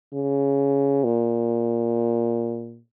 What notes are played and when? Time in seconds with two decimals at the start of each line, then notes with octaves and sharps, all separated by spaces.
0.14 C#3
1.04 A#2